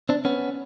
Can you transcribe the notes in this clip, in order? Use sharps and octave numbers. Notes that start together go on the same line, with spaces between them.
C4 D4
B3 C#4